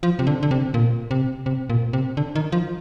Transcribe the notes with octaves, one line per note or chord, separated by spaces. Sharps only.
F3
C3
D3
D3
C3
A#2
C3
C3
A#2
C3
D3
D#3
F3